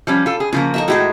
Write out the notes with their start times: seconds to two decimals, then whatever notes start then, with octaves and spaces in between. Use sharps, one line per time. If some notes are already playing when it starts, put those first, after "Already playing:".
0.07 F3 G3 C#4
0.26 F4 A4
0.40 G#4
0.53 C#3 F3 A#3 F4
0.74 D#4 A4 E5
0.88 A2 G#3 F#4 G4 C5